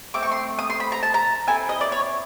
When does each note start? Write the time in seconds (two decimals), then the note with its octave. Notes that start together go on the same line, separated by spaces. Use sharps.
0.14 A3 C4 D6
0.23 C#6
0.31 C6
0.59 D#6
0.70 C6
0.80 B5
0.92 A#5
1.03 A5
1.14 A#5
1.47 C4 E4 A4 G#5
1.69 D#5
1.81 D5
1.92 C#5